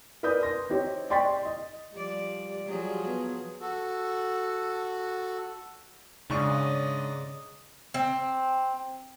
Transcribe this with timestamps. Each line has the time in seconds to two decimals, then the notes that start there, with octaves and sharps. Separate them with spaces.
0.23 A#4 B4 D5 D#6 G6
0.43 C6 A#6
0.70 C4 D#4 G4 C5 C#5
1.10 D5 G5 C6 C#6 A6 B6
1.45 D#5
1.94 F3 G3 D5
2.66 F3 F#3 G#4
3.06 B3
3.61 F#4 A4
6.30 G#2 C#3 D4 D5 D#5 C#6
7.94 C4